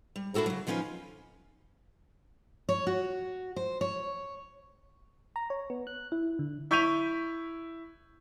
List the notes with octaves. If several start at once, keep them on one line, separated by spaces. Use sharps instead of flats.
G3
D4 E4 F#4 A4 A#4
C#3 F#3
D#3 F3 C#4 F4 B4
C#5
F#4
C5
C#5
A#5
C#5
B3
F#6
E4
D3
E4 C#6 G6 B6 D#7 F7